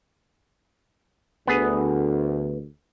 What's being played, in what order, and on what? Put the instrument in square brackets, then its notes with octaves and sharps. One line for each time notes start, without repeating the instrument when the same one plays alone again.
[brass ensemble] D2 [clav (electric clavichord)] B3 G#4